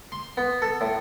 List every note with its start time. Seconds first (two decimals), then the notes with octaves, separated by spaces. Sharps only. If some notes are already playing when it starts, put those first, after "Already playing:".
0.12 C6
0.37 B3
0.62 A4
0.81 A2